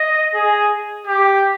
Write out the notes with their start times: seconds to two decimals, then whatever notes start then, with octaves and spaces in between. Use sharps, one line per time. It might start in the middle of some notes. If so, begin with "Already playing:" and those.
Already playing: D#5
0.34 G#4
1.07 G4